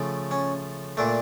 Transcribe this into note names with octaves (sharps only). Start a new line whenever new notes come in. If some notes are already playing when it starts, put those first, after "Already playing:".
Already playing: C#3 F3 A3
C#4
A#2 A3 D4